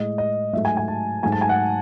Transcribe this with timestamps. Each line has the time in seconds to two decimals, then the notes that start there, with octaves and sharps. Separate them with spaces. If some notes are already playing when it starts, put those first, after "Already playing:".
Already playing: A2 G#3 D#5
0.18 D#5
0.53 G#2 F#3 A3 E5
0.65 G#5
0.77 G#5
0.88 A5
1.23 G#2 F#3 A3 G#5
1.32 A5
1.41 G#5
1.49 F#5